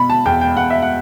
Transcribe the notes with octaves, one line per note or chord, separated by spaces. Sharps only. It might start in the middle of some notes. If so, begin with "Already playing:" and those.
Already playing: B2 B5
A5
E2 G5
G5
E2 F#5
E5
F#5